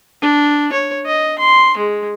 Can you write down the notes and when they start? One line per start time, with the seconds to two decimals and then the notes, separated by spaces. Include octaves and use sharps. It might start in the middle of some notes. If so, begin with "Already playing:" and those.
0.22 D4
0.72 C#5
1.06 D#5
1.39 C6
1.77 G#3